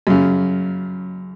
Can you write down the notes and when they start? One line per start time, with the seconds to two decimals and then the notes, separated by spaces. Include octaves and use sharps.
0.07 F#2 C#3